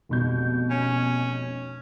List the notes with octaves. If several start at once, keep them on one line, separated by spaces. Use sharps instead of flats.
F1 B2 G6
C#4